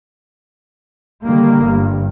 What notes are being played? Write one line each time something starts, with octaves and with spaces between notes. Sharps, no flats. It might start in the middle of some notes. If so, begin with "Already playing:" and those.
D3 D#3 G3 A#3
G1 G2